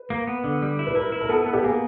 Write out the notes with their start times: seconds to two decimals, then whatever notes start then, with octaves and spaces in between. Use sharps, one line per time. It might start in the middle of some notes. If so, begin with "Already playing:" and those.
Already playing: B4
0.10 A#3
0.27 B3
0.44 D3
0.62 G3
0.79 E4
0.87 B4
0.95 E4 A#4
1.12 E4
1.21 A#4
1.29 B3 A4
1.46 B3
1.53 G4
1.64 A#3 G#4